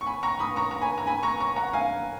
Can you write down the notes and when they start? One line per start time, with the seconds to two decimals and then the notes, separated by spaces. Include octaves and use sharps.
0.01 C#6
0.06 G#5 B5
0.23 A#5 C#6
0.39 B5 D#6
0.56 A#5 C#6
0.71 A#5
0.81 G#5 B5
0.98 A#5
1.06 G#5 B5
1.23 A#5 C#6
1.40 A#5 C#6
1.56 F#5 A#5
1.73 F5 G#5